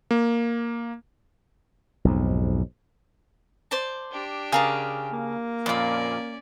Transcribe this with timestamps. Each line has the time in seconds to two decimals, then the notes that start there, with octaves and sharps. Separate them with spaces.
0.11 A#3
2.05 B1 F2 G#2
3.71 C5 D5 A5
4.12 D4 G4
4.52 C#3 G#4 A#4 A5
5.12 A#3
5.66 F2 A#2 C#4 F4 D5 B5